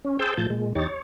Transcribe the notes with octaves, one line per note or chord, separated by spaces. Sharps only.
C#4
G#4 C5 G5 A5 E6 G6
A2 F3 A5 G6
A#2 G#3
E2 D#4 G4 C#5 A6
C#5